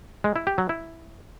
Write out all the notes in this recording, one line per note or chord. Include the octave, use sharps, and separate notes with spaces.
G#3
E4
G4
F#3
E4